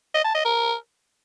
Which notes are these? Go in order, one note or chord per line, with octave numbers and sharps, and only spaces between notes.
D#5
A5
D#5
A#4